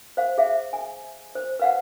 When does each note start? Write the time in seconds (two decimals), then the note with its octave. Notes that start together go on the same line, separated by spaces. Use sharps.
0.17 C5 F5
0.38 G#4 E5 F5
0.73 G#5
1.35 C5
1.60 B4 F5 F#5